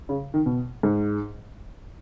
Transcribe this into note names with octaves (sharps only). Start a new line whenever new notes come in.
C#3
D#3
B2
G#2